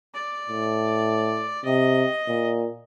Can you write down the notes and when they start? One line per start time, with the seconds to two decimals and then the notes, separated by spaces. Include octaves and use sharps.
0.14 D5
0.49 A2
1.65 C3 D#5
2.28 A#2